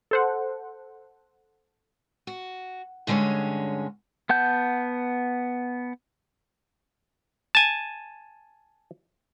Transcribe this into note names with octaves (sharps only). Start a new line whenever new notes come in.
A4 C5 F#5
F#4
G2 D3 G#3 C#4 C#5
B3 F#5 A5 G6
G#5 A5